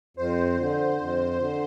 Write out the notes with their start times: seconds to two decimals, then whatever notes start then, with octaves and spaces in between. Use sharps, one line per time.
0.17 F2 C5
0.58 D3
0.98 F2
1.39 D3